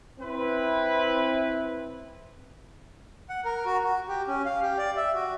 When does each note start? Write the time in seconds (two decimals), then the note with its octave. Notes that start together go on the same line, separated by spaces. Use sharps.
0.20 C4 E4 B4
3.29 F#5
3.45 A#4
3.66 F#4
3.84 F#4
4.08 G4
4.28 C#4
4.46 F5
4.62 G4
4.78 D5
4.97 E5
5.14 F#4